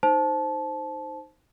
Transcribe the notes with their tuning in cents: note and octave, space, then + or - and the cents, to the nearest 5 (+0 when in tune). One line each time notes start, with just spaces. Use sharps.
D#4 +0 C5 +0 A5 -20